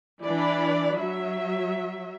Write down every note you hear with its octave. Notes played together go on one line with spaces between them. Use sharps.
E3 D4 D5 B5
F#3 E5